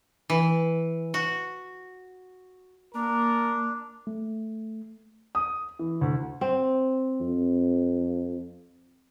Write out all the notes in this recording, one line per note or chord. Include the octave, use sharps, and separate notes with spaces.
E3
F#4
A#3 D4 A#4
A3
D#6
E3
D2
C4
F2